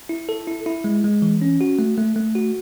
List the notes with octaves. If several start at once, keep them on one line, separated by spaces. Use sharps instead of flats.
E4
A4
E4
E4
G#3
G#3
E3
C#4
F#4
A3
A3
A3
F#4